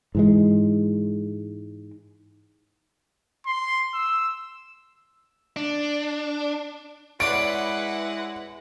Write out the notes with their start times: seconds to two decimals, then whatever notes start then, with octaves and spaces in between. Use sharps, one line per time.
0.15 G#2 E3 G#3
3.46 C6
3.94 E6
5.56 D4
7.20 G#3 E4 B4 C#5 D5 F#5 C6 D7